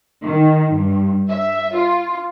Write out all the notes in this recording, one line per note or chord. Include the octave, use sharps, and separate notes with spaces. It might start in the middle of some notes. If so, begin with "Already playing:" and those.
D#3
G2
E5
F4